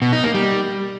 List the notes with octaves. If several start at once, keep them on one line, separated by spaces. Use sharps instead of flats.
B2
D#4
A#3
G3